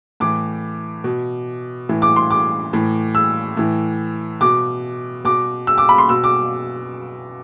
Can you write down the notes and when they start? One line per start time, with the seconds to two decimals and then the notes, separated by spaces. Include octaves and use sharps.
0.20 A2 E3 D6
1.04 B2
1.89 A2 E3
2.02 D6
2.16 C6
2.31 D6
2.73 A2 E3
3.15 E6
3.57 A2 E3
4.41 B2 D6
5.25 B2 D6
5.67 E6
5.78 D6
5.89 B5
5.98 C6
6.09 B2 E6
6.24 D6